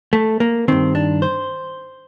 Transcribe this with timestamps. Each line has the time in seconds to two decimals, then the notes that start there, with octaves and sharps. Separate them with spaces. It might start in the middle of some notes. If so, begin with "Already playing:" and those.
0.13 A3
0.40 A#3
0.68 G2 D#3 C4
0.95 D4
1.22 C5